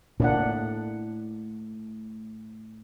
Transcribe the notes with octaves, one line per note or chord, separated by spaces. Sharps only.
A2 A#3 D4 F#5